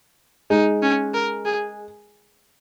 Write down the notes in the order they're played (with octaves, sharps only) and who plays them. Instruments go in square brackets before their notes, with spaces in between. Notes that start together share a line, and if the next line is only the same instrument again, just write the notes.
[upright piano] G#3 [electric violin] D#4
[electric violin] C#4
A#4
G#4